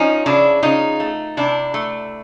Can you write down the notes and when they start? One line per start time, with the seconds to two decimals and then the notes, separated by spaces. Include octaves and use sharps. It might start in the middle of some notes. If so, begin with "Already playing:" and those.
Already playing: F3 C#4 D#4
0.26 C#3 D4 E4
0.63 C#3 D#4 F4
1.00 A3
1.37 C3 D4 E4
1.74 A3